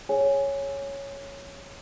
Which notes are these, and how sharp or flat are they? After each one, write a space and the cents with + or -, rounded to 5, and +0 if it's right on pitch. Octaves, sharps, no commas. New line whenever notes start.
G#4 +0 C#5 +0 G#5 +0